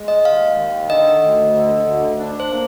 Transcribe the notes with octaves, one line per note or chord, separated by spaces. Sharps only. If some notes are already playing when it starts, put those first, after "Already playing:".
Already playing: G#3
D#5
D#2 F5
D#3
D3 D#5
D2
D3
D2
D4
C5
A#3